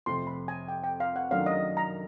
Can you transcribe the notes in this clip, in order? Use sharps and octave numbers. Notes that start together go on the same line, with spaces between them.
F2 C3 F3 A3 C4 C6
B5
G#5
G5
G5
F5
F#5
F#2 D#3 F#3 A3 D4 F5
D#5
A#5